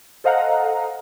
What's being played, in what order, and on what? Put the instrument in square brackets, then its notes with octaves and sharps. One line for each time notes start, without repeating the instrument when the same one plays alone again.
[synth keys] A4 C5 D#5 F5 F#5 A#5